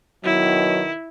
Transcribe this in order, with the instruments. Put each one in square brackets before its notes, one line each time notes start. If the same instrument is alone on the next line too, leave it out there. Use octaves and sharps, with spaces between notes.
[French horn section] B2 D#3 [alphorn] F#3 [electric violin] E4